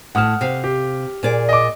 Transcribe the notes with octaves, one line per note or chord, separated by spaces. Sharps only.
A2 F#5 A5 D#6 F6
C3 F5
G4
A#2 G#4 D5
D#5 D6